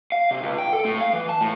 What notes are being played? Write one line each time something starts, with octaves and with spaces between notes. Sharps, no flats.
F5
C3
C#2
G5
A4
A2
F5
E3
A5
A2